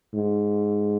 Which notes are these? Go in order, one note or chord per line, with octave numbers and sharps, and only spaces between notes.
G#2